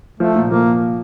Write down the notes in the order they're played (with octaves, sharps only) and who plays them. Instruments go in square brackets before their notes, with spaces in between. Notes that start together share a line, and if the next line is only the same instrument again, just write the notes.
[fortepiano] F3 [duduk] A3
[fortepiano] A#2
[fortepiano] F3 [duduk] A#3